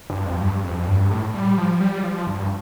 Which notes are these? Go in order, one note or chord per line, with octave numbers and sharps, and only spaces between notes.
G2
F2
G2
F2
G2
A2
G3
F3
G3
F3
G2